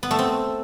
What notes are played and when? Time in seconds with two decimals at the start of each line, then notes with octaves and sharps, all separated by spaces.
0.03 B3
0.11 A3
0.19 C4